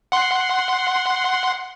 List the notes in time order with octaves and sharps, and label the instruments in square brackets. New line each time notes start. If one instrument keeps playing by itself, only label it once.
[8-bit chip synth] F#5 C6